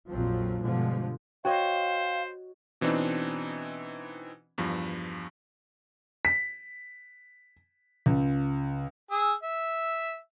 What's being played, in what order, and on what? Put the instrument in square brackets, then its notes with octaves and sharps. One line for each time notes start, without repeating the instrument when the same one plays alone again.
[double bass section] A#1 F2 F3 F#3 C4
G2 B2 D3 F3 G#3
[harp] F#4 C#5 D#5 [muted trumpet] C5 [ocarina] F5 [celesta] G5
[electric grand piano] B2 E3 C4 D4 D#4
E2 G2 F3
[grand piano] B6
C#2
[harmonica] G#4 E6
E5